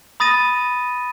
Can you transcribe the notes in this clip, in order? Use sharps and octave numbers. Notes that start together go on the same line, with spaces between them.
B5 D#6 A6 A#6 D#7